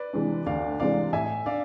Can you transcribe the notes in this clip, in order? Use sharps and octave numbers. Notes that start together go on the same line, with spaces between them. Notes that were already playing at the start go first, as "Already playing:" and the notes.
Already playing: B4 D5
C3 E3 G#3 D4
D2 D5 F5
C3 E3 G#3 D4 D5 F5
A2 E5 G#5
D4 D5 F5